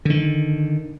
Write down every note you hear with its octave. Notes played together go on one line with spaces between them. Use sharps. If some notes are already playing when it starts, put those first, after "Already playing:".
D3 D#3